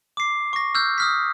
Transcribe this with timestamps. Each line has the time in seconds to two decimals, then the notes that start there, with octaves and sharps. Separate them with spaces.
0.17 D6 C7
0.53 C#6 A#6
0.75 E6 F6 G6
0.98 D#6 F6 B6